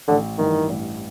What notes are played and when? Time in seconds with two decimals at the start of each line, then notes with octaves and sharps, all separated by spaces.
0.08 A1 D3
0.38 G2 D#3 E3
0.69 A1